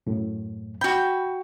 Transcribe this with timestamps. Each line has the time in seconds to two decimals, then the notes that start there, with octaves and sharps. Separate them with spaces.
0.07 F#2 A2
0.81 F#4 G5 B5